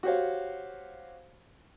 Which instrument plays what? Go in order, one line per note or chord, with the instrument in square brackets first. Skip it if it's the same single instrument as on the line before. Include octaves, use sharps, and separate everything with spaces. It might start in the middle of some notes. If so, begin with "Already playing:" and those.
[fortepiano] F#4 G4 C5 C#5 F5